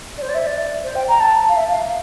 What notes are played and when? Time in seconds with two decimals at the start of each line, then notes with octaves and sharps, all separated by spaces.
0.18 D5
0.22 C5
0.29 D5
0.35 E5
0.46 D5
0.84 C5
0.95 G5
1.08 A#5
1.20 A5
1.49 F5
1.56 E5
1.69 F5